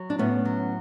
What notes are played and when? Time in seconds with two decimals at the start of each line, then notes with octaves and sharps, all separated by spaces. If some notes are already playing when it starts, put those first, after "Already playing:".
Already playing: F#3
0.10 D4
0.19 A2 B3 C#4
0.45 F#3